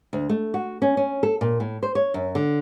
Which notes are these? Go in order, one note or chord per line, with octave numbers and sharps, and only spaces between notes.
D2
A3
F#4
C#4
C#4
A4
A#2
A2
C5
C#5
F#2
D3